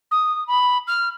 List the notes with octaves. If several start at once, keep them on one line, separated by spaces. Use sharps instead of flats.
D#6
B5
F6